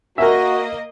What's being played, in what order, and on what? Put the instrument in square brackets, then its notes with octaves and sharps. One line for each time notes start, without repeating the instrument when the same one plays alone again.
[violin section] A#3 D#5 [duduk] F#4 [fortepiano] A#4 E5